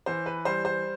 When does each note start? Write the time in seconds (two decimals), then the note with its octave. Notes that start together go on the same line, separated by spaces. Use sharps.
0.06 E3 C5
0.26 B4
0.45 G3 C5
0.65 C5